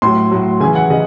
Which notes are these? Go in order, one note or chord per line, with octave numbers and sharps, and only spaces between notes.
A2 F#3 C6
A2 F#3
C#3 E3 G#5
F#5
C#3 D#5